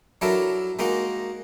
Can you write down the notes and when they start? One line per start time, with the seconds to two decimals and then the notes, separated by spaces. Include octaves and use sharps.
0.21 F#3 D4 E4 F#4 A4 A#4
0.79 G#3 A#3 D#4 F#4